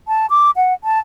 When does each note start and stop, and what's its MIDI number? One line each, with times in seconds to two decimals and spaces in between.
0.08 0.26 81
0.30 0.51 86
0.56 0.74 78
0.84 0.99 81